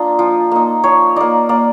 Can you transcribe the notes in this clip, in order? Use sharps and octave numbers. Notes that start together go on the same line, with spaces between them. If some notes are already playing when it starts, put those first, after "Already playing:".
Already playing: A#3 D4 F4 D#5
F3
A#3 D#4
F3 C#5
A#3 D#4 D5
A#3 D5